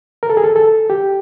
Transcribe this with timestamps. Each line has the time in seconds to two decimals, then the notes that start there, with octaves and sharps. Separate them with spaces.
0.23 A#4
0.30 A4
0.37 G#4
0.44 A4
0.56 A4
0.90 G4